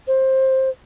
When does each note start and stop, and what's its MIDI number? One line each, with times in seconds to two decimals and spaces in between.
0.07 0.69 72